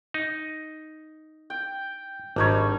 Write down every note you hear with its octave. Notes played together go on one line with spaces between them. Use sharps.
D#4
G5
G#1 G3 D4 D#4 C#5